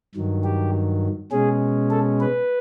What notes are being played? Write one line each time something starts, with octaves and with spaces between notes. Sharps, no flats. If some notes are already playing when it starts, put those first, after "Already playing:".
G2 D#3 F#3
G4
B2 G#3 C#4 G#4
A4
B4